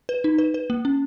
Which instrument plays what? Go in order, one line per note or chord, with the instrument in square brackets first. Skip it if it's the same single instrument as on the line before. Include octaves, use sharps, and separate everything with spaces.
[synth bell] B4
D#4
B4
B4
A#3
C#4